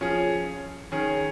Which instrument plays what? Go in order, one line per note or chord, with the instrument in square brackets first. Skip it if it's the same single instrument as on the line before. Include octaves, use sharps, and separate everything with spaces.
[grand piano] F3 C#4 G#4
D#3 C#4 G#4